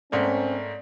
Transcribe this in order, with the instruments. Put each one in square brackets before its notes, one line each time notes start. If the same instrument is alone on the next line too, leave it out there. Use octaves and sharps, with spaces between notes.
[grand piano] G#2 A3 A#3 [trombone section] C4 C#4 [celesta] D5